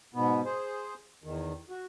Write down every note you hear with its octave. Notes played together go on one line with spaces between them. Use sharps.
G#2 B2 B3
G#4 C5
E2 D#3
F#4